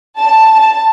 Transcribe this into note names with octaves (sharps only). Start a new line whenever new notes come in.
A5
A5